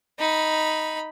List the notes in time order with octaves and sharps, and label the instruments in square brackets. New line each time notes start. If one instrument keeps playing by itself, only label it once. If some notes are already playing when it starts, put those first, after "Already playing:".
[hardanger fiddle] D#4 B5